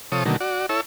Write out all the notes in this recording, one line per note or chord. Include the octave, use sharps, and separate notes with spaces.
C3 F3 A4 C#5 D#6
B2 D3 D#3 F#3 A3 A#3
F#4 D5
E4 A4 C#5 E6